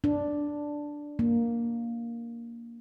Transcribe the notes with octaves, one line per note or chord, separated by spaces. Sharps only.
D4
A#3